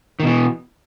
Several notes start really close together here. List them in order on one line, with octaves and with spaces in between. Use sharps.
D#3 B2 E3